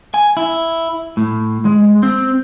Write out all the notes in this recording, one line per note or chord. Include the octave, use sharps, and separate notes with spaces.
G#5
E4
A2
G#3
C4